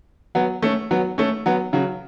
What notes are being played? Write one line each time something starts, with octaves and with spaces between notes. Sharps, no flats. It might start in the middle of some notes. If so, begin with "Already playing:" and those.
F#3 B3
A3 C#4
F#3 B3
A3 C#4
F#3 B3
C#3 F#3